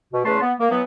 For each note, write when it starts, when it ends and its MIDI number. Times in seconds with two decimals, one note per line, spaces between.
0.12 0.24 47
0.25 0.40 40
0.25 0.40 49
0.25 0.40 57
0.25 0.40 71
0.25 0.40 81
0.25 0.40 84
0.41 0.53 59
0.59 0.68 58
0.71 0.82 52
0.71 0.82 54
0.71 0.82 59